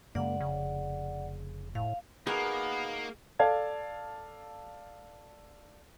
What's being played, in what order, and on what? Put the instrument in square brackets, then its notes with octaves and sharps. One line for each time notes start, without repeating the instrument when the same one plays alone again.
[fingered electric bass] F#2 C#3 G#3 [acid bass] A#3 [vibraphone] D5 F#5
[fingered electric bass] F1 [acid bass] C#3
[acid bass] A2 [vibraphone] F5
[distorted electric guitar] A#3 [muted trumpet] B3 [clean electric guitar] D#4 F#4 A#4 [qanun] G#4
[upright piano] A4 D5 F5 A5 G#6